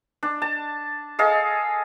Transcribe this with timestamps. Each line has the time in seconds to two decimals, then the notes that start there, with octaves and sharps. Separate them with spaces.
0.23 D4
0.42 A5
1.19 G#4 A4 D#5 F5